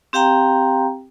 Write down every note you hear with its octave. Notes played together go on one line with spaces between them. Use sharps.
C4 G4 F5 G5 A#5